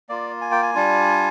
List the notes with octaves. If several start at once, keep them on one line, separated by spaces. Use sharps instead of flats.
A#3 F4 D5
G#5
G5
G#5
G3 D4 F4